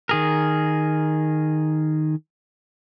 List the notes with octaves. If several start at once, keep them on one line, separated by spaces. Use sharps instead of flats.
D#3 G#4 A#4